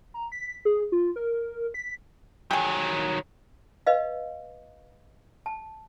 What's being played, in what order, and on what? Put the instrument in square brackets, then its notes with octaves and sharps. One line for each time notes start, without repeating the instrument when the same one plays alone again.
[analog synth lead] A#5
B6
G#4
F4
A#4
B6
[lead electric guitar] D#3 F#3 [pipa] G4 G#4
[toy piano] B4 D#5 F5
A5